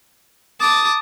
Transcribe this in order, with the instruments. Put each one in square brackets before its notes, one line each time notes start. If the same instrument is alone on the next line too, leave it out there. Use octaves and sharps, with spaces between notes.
[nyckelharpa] A5 D6 [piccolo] D#6